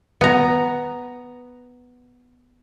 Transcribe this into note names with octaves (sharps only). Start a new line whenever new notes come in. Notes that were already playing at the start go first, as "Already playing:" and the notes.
B3 A#5